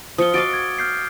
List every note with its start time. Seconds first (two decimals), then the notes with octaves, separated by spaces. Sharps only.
0.18 F3 F4 D#6 C#7 G7
0.34 F#4 D#5 F5 D6 A6 D7
0.53 G#6
0.78 F6 G6 C7